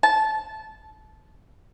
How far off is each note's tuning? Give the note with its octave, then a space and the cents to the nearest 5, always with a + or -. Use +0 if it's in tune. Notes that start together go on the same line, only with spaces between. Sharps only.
A5 -20